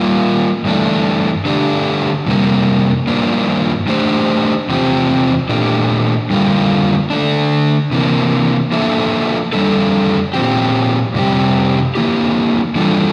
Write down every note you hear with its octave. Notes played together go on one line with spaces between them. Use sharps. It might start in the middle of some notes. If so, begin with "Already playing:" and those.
Already playing: G3 A#3 F4
G2 E3 A3 D4
D3 A3 D4 G4
F2 C3 G3 A#3
G2 F3 A#3 D4
A3 D4 G4 C5
E2 C3 F3 C4 G4
A#2 A3 D4 G4
F2 D3 G3 A#3 F4
D3 A3 D4
C3 E3 A#3
F3 A#3 D4 A4 E5
F2 E3 G3 D4 A4
A#2 F3 C4 G4
F2 C3 G3 C4 G4
F2 E3 A#3 E4 G4
E3 G3 D4 F4 A4